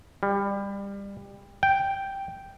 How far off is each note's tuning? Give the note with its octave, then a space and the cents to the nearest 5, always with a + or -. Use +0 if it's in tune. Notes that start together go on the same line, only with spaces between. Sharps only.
G3 +25
G5 +0